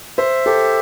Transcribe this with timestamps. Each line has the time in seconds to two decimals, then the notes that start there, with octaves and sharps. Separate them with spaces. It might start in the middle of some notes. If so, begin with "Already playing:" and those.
0.18 C5 E5
0.46 G4 A4